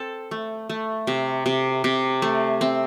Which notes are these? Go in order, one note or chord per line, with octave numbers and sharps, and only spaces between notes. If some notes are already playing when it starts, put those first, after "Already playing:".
Already playing: C4 A4
A3
A3
C3
C3
C3
A3
C4